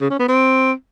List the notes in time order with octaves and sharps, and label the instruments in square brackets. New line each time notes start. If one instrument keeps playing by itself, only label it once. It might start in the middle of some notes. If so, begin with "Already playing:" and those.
[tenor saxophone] C#3
C#4
B3
C4